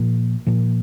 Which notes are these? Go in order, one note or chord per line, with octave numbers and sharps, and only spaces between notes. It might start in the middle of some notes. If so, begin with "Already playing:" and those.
Already playing: A#2 F3 A#3
A#2 F3 A#3